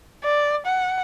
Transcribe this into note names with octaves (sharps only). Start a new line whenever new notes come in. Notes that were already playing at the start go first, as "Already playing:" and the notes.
D5
F#5